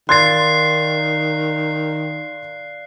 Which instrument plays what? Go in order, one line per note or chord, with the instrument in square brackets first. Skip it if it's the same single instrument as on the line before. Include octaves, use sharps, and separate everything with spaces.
[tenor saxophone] D#3 [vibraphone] D5 F5 [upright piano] C6 G#6 A6 [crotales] F#6 C7